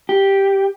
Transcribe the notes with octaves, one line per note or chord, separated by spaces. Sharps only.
G4